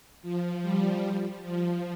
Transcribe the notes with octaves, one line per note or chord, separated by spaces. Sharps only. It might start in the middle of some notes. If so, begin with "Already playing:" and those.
F3
G3
F3